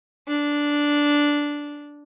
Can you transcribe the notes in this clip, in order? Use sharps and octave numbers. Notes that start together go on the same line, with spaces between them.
D4